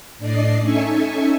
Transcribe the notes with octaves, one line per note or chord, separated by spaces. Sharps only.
A2 D4 D5 D#5 C7
C#4 D#4 A4 E5 G#5 C#6